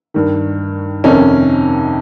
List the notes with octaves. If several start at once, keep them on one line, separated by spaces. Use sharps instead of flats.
G2 D#3
F2 C3 D#3 C#4 D#4